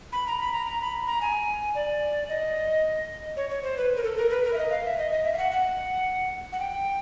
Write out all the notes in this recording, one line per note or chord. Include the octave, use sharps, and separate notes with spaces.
B5
A#5
B5
A#5
A#5
B5
A#5
G#5
D5
D#5
C#5
C#5
C5
B4
A#4
A4
A#4
B4
A#4
E5
D#5
F5
E5
D#5
D#5
E5
F5
F#5
F#5
F#5
G5